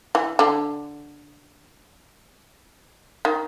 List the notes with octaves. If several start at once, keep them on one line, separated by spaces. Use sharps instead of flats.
E3
D3
D#3